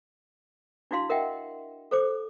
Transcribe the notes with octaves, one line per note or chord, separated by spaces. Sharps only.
D4 E4 F#4 F5 C6
A#4 D#5 E5 F#5 G5
A4 C5 D6